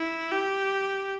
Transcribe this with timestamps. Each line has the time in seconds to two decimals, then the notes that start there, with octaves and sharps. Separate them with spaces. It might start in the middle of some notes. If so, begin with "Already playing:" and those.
Already playing: E4
0.31 G4